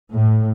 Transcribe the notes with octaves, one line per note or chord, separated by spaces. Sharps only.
A2